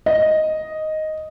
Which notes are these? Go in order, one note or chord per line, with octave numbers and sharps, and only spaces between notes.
D#5